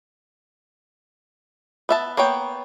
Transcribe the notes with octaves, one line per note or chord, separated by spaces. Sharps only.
B3 E5 A5
A#3 B3 C#5 G5